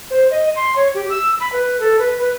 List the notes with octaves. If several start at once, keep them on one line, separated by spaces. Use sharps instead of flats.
C5
D#5
C6
C#5
G4
E6
B5
B4
A4
B4
B4